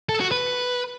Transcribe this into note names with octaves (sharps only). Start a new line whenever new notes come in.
A4
F#4
B4